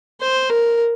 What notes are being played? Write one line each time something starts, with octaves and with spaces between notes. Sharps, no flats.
C5
A#4